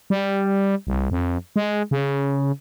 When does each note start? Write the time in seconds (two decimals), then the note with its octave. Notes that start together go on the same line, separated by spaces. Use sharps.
0.10 G3
0.87 C2
1.11 F2
1.56 G#3
1.91 C#3